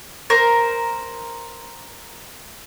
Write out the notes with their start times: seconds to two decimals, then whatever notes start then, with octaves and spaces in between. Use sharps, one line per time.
0.30 A#4 C5